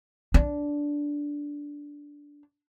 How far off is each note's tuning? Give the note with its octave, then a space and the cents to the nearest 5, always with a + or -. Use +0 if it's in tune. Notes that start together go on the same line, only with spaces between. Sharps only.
D4 -10